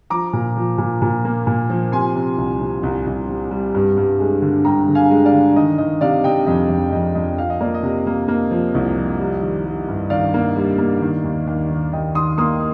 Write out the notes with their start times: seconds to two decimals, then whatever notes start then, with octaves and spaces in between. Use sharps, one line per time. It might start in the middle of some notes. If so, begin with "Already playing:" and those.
0.10 F3 A#5 D6
0.33 A#2
0.57 F3
0.78 A#2
1.02 A#2
1.25 A#3
1.47 A#2
1.70 F3
1.92 C3 G#5 C6
2.15 C3
2.38 C2
2.60 C3
2.83 C2
3.06 C2
3.29 C3
3.51 G3
3.74 G2
3.98 G2
4.20 G#3
4.42 D3
4.65 G2 G5 A#5
4.88 D3
4.95 F5 G#5
5.11 G#3
5.25 D5 F5
5.33 D3
5.56 D#3 D#5
5.78 D#3 D#5
6.01 C3 D5 F5
6.24 C3 D#5 G5
6.46 F2 D#5
6.69 F2 D#5
6.92 F2 D#5
7.15 F2 D#5
7.38 F3 F5
7.50 D#5
7.60 A#3 D5
7.74 D#5
7.83 C3
8.07 A#3
8.28 A#3
8.51 F3
8.75 C2
8.97 F3
9.19 G3
9.42 D#3
9.65 G3
9.88 G2
10.10 D#3 D5 F5
10.34 A#3
10.56 G3
10.78 A#3
11.01 D#3
11.24 D#2
11.47 D#2
11.70 D#3
11.93 D#2 D#5 G5
12.15 D#3 C6 D#6
12.38 A#3 C6 D#6